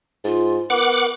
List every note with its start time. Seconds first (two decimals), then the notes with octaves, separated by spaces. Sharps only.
0.25 G#2 F4
0.70 B3 A#4 F#5 D6